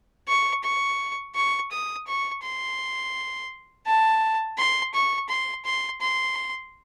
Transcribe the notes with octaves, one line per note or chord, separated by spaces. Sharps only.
C#6
C#6
C#6
D#6
C#6
C6
A5
C6
C#6
C6
C6
C6